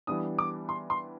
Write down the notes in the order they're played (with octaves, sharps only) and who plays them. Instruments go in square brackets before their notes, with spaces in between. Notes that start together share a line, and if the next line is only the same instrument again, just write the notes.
[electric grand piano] E3 G3 B3 D4 [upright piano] D#6
[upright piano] D6
C6
C6